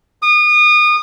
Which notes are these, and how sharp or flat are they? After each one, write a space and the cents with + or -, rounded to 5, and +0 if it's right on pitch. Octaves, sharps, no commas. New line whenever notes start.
D#6 -30